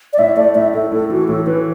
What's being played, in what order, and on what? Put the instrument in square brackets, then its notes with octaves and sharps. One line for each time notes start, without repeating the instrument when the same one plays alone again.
[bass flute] D5
[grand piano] A2 [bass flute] E5
[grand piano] A3 [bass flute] D5
[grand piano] A2 [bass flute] E5
[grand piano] A2 [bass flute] A4
[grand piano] A2 [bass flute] A4
[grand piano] E3 [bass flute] F#4
[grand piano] A2 [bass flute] A4
[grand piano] E3 [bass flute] B4